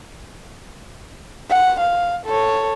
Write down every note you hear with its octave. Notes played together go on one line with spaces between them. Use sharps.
F#5
F5
A4 C#5